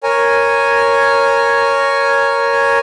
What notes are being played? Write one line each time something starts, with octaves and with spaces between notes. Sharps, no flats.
A#4 C#5 G#5